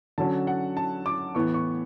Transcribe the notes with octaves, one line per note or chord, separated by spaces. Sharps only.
D3 F#3 C#4 A5
F#5
A5
D6
A2 E3 B3 C#6
C#6